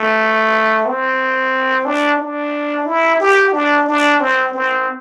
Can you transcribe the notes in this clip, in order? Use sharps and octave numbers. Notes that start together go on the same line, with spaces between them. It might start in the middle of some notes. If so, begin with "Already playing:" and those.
Already playing: A3
C4
D4
D4
E4
G4
D4
D4
C4
C4